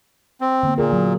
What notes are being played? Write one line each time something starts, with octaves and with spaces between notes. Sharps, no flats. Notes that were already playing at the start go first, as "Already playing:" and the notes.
C4
D3 A#3 B3
A#2 G#4 A#4
F#3